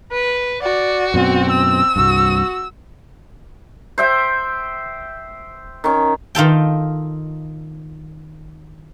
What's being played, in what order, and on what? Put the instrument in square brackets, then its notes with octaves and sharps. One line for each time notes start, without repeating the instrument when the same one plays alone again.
[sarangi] B4
[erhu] F#4 [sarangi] D5
[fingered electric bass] F#2 B2 [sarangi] C4
[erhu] E6
[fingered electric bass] C2 G2 [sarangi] F#4
[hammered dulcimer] C5 E5 G5
D#3 C#4
[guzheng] D#3 F4 A4 G5